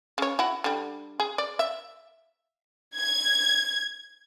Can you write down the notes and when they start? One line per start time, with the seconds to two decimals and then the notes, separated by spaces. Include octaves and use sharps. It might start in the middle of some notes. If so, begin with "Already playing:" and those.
0.18 C#3 C#5
0.39 E4 F#4
0.64 D3 G3
1.20 G#4
1.38 D5
1.59 E5
2.97 G#6